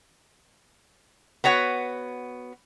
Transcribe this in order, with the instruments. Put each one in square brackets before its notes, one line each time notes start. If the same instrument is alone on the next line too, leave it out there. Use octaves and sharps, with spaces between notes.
[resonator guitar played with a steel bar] B3 F#4 C#5 F#5